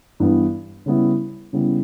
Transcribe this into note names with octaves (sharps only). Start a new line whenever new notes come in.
G2 E3 B3
C#3 G3 B3 E4
C#3 G3 B3 E4